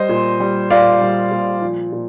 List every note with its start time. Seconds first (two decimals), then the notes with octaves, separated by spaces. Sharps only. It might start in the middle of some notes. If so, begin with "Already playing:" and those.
Already playing: G3 C5 D#5
0.09 A#2
0.40 G3
0.70 A#2 D5 F5
1.01 G3
1.31 A#2
1.62 F3
1.92 A#2